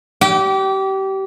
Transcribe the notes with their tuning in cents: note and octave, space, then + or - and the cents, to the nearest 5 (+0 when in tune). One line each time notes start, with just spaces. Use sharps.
G4 -25 G5 -35